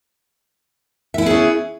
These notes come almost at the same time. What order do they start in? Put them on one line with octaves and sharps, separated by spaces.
E5 E4 B3 G#4 C#4